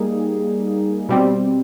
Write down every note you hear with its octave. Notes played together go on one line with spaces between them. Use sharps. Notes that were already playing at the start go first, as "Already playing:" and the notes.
Already playing: G3 A#3 D#4 G#4
B2 G3 C4